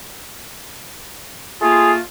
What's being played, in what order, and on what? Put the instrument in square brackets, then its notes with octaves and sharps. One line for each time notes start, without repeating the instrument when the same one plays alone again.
[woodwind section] A3 A#3 F4 [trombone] G#4